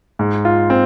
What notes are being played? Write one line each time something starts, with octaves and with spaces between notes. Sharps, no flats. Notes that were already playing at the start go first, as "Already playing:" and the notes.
G#2
F4
C4